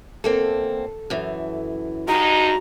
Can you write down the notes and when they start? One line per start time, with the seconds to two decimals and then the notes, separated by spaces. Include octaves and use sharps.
0.24 E2 A#3 C4 A4
1.10 F#2 E3
2.08 G2 G#3 D#4 F#4 A#5